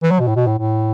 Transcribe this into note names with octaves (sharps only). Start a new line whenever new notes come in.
E3
F#3
B2
A2
B2
A2
A2